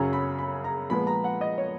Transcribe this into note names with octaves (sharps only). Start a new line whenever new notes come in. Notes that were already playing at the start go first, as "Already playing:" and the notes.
Already playing: F#2 C#3 F#3 C#4 A#5
B5
B5
A#5
A#2 F3 G#3 B3 B5
A#5
F#5
D#5
C#5